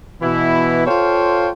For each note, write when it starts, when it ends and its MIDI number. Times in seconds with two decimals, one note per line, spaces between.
0.22 0.84 47
0.22 0.84 52
0.22 0.84 64
0.87 1.49 65
0.87 1.49 69
0.87 1.49 72
0.87 1.49 73
0.87 1.49 77
0.87 1.49 79